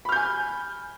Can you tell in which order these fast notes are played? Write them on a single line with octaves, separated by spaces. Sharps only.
B5 F6 G6 G#5